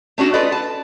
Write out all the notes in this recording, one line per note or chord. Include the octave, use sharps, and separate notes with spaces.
A3 C#4 D4 F#4
F4 A4 B4 D5 D#5
A5